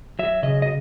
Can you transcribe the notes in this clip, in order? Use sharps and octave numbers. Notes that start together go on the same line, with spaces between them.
F#3 E5
C#3 D#5
D#5